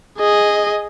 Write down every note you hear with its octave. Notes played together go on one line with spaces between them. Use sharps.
G#4 D#5